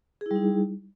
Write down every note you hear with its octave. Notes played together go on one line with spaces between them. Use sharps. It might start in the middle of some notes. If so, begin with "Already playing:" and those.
G3 D#4 E4 G#4